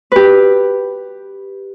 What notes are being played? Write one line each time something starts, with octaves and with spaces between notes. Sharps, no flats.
G4 B4